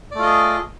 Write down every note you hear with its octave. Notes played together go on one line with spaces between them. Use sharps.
A3 F4 G#4 D5 D#5